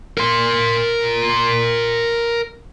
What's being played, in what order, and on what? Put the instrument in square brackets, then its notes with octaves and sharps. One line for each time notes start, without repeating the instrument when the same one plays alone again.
[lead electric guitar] A#4 C6